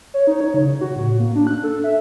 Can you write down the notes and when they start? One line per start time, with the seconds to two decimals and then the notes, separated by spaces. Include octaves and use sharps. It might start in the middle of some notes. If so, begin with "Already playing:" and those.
0.14 C#5
0.27 D#4
0.41 C#5
0.54 C#3
0.81 F#4
0.96 A2
1.20 A#3
1.35 D4
1.47 F#6
1.63 A4
1.84 E5